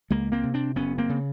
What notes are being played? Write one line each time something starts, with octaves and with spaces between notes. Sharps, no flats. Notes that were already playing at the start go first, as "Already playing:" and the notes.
C#2 G#3 A#3
A#3 C4
C3
C4 D4
F#1 B3 C#4
A#3 C4
C#3